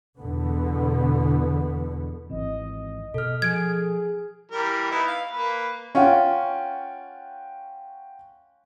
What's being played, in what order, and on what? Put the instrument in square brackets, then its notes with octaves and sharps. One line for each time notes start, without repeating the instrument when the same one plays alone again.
[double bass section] E2 B2 D3 B3
[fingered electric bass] G#1 E3 C4 [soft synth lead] D#5
[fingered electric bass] B2 [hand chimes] A4 F6
[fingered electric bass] F3 [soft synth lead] G#4 [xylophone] G#6 D7
[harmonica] E3 G3 A#4
B3 D#4 E4
F5
A#3 B4
[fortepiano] C#4 F4 [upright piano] F#5 G5 C#6